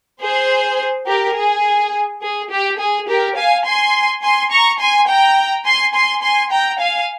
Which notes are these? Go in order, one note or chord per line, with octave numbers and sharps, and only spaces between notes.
G#4 C5
G4 A#4
G#4
G#4
G4
G#4
G4 A#4
F5 G#5
G#5 C6
G#5 C6
A#5 C#6
G#5 C6
G5 A#5
G#5 C6
G#5 C6
G#5 C6
G5 A#5
F5 G#5